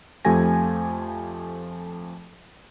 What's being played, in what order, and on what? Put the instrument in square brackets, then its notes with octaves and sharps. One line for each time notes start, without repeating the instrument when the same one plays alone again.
[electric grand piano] F2 F3 A3 G4 G#5 A#6